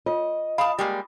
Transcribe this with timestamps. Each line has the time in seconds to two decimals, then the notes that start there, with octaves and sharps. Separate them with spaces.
0.06 F4 D#5
0.58 F5 A5 B5 D#6
0.79 G3 G#3 A#3